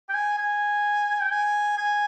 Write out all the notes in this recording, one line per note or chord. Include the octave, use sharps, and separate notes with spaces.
G5
G#5
G#5
G5
G#5
G#5